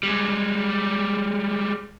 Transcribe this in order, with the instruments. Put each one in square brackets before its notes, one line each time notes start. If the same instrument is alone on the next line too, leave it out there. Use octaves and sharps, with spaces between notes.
[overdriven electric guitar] G3 G#3